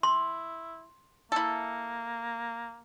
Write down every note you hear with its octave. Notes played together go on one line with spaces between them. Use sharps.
E4 C6
A#3 E4 A4